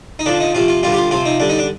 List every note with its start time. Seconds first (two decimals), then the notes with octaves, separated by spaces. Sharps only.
0.19 D#4
0.26 D3 F3 D4
0.40 D#4
0.55 C3 F3 F4
0.68 F4
0.83 D3 G3 F4
0.92 G4
0.97 F4
1.11 C3 F3 F4
1.25 D#4
1.40 D3 G3 D4
1.49 D#4
1.59 D4